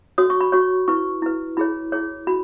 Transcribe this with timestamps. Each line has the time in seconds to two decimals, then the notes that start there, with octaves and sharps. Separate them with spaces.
0.18 F#4 C#5 D#6
0.30 C#6
0.41 B5
0.52 F#4 C#5 C#6
0.88 E4 B4 C#6
1.22 E4 B4
1.57 E4 G#4 C#5 B5
1.92 E4 G#4 C#5
2.27 F#4 B5